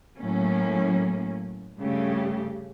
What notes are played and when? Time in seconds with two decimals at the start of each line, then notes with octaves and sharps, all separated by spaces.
0.17 A2 F#3 A#3 C#4
1.78 G2 C#3 A3 G4